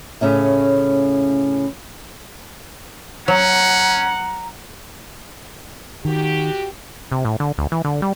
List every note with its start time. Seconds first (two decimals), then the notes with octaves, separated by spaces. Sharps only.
0.21 A2 C#3 C#4 E5
3.28 F#3 C#4 F#5 A#5
6.05 D#3 F#4 G4
7.12 C3
7.25 A2
7.40 D3
7.58 D2
7.72 E3
7.85 D3
8.02 G3